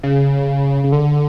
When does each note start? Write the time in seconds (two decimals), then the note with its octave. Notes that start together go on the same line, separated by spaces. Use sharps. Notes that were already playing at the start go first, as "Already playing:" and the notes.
0.03 C#3
0.84 C#3
0.92 D3